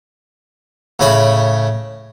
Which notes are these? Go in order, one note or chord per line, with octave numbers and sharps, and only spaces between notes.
A2 C#3 C#4 B5